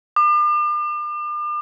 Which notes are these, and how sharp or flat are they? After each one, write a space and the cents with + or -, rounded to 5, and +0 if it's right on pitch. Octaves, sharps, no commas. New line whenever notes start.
D6 +40